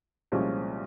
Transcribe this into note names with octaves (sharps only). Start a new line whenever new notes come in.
C2 A#2 F3 G#3 C#4